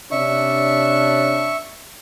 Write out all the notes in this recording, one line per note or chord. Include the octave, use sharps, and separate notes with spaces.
C3 C#4 D4 E5 C#6